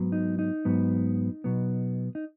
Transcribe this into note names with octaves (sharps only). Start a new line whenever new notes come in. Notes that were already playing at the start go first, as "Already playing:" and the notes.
Already playing: G#2 F#3 B3
D#4
D#4
G#2 F#3 B3
B2 F#3 B3
D#4